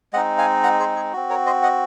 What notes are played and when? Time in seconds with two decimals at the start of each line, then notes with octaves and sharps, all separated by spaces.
0.13 G#3 C4 D#4 D#5 F#5
0.38 F5 G#5
0.63 F#5 A#5
0.79 G#4 C5
0.96 G#4
1.13 C4 F#4
1.30 A#4 C#5
1.46 C5 D#5
1.63 D#5 F#5